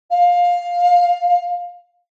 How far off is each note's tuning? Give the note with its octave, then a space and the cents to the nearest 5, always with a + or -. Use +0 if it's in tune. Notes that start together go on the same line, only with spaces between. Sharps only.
F5 +15